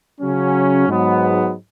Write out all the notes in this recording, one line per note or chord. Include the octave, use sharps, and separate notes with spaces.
C#3 F#3 C#4
G#2 F#3 B3